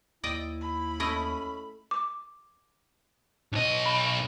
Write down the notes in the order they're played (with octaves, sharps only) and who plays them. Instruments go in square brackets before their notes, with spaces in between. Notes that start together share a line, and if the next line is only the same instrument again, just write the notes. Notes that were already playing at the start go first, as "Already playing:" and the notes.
[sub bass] D#2 [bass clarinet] E4 [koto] D5 D#5 G5
[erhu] B5
[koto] A3 E4 D#5 [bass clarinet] C#4
[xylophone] D6
[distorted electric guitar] B1 D#5
[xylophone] B5